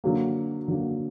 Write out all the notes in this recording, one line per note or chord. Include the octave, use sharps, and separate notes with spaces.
D3 F#3 A#3
D3 F#3 A#3